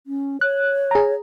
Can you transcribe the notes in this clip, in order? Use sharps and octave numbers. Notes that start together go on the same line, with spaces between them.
C#4
C#5 F#6
G#4 A#5